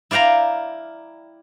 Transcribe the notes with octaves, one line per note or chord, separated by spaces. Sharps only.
E4 D5 F5 G5 A#5